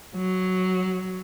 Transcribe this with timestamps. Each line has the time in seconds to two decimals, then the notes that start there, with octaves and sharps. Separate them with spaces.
0.16 F#3